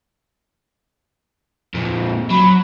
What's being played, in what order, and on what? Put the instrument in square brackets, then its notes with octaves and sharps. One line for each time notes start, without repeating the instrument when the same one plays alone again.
[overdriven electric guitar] F2 A#2
[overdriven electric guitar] F#3 [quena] B5